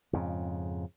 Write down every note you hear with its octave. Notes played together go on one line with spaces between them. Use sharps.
F2 G#2 C#3